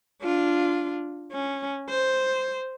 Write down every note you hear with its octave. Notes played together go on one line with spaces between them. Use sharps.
D4 F4
C#4
C5